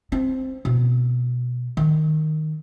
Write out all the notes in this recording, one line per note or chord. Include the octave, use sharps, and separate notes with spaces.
C4
B2
D#3